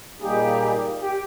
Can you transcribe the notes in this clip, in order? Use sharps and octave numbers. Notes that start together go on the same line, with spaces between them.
A#2 G3 A#3 D#4 G4 G#4
G4